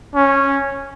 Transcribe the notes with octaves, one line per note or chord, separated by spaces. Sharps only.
C#4